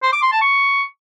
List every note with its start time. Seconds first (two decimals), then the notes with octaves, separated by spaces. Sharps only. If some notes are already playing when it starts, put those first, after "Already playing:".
0.03 C5
0.12 D6
0.22 C6
0.32 A5
0.41 C#6